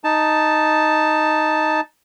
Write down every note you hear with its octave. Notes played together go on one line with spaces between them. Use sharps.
D#4 A5